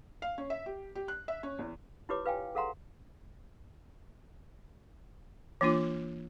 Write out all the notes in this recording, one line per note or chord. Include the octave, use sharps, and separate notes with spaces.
F5
C#4
E5
G4
G4
F#6
E5
C#4
E2
E4 F4 G4 B4 C#5 D6
B4 F5 G5 G#5
G#4 A4 F5 F#5 A#5 C6
E3 A#3 D4 F4